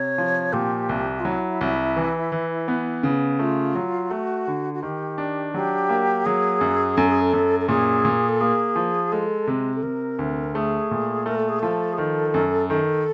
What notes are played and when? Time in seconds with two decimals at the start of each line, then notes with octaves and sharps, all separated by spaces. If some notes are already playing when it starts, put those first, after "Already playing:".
Already playing: C3 C#5
0.18 F3
0.53 A#2 G4
0.89 C2
1.20 F4
1.25 F#3 E4
1.61 C2
1.96 E3
2.32 E3
2.68 B3
3.03 C#3
3.39 A3 F4
3.75 F#3
4.11 A3 F#4
4.48 D3
4.74 F#4
4.83 D#3 G4
5.18 D4
5.54 F#3 G4
5.89 A#3
6.25 F#3 G#4
6.61 F#2
6.97 F#2 A4
7.09 G#4
7.21 A4
7.33 F#2
7.60 A4
7.68 A#2 G#4
8.05 A#2
8.29 A4
8.41 A#3 G#4
8.76 F3
9.12 G#3 A4
9.47 C3
9.75 A4
9.83 C3 A#4
10.19 D2
10.55 A3 G#4
10.91 A#2
11.26 A3 A#4
11.37 A4
11.49 G#4
11.59 F3 A4
11.93 G#4
11.97 D#3 A4
12.34 F#2
12.69 D#3 A4